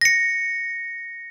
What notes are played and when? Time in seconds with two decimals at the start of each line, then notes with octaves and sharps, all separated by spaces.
0.01 A#6 C#7